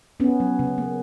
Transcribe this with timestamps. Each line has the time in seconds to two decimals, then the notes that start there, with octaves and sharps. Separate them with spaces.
0.20 B3 C#4
0.40 F#3
0.59 C#3
0.78 A#3